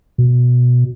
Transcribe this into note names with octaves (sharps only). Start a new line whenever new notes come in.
B2